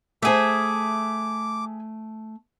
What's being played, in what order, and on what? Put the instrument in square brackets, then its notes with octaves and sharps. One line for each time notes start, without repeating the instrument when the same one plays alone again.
[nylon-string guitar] A3 C5 [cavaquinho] G#4 E5 [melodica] D6